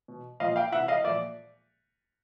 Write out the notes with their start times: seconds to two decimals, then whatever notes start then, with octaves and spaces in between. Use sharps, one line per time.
0.08 B2
0.40 A#2 F3 D#5 F5
0.56 F5 G5
0.72 C3 E3 E5 F#5
0.88 D#5 F5
1.04 A#2 F3 D5 E5